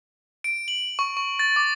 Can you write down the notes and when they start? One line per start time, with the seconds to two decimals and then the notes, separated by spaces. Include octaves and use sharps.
0.44 D7
0.68 F#7
0.99 C#6
1.17 C#6
1.39 A6
1.56 D6